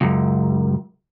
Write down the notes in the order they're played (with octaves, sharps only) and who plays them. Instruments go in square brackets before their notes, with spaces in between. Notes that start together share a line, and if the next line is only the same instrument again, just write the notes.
[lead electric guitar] C#2 F#2